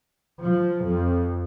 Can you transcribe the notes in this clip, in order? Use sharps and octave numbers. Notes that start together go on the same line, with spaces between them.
F3
F2